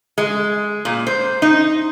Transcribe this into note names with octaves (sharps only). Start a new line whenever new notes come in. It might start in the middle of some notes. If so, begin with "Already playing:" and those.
G#3
A#2
C5
D#4